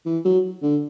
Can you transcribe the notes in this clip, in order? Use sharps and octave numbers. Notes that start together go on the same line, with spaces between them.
E3
F#3
D3